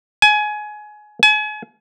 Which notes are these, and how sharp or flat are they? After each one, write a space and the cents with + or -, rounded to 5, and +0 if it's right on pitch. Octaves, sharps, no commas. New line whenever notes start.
G#5 +20
G#5 +35